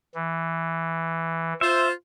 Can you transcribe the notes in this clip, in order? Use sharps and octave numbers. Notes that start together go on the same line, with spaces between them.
E3
F4 C5 E5